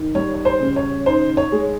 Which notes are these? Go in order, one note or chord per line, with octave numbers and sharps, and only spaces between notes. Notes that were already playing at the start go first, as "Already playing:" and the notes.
Already playing: D#3
G3 C#5
C#5
C5
C#3
C#5
D#4 C5
C#5
G#3